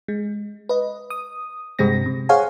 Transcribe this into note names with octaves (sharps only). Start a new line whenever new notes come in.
G#3
B4 D#5
D#6
G2 C3 G#3 C4 A#6
C3
G#4 C5 C#5 F5 F#5 G#5